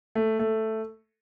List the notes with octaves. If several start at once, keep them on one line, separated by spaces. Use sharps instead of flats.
A3
A3